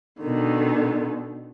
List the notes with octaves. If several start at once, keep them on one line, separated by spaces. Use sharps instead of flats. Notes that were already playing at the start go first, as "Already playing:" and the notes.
B2 D3 D#3